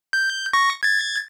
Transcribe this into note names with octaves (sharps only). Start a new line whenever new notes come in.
G6
C#6 A#6
G#6 A6